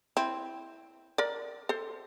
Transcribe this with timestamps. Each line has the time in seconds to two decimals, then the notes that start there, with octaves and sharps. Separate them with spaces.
0.17 C4 E4
1.18 A#4 D5
1.69 A4 C5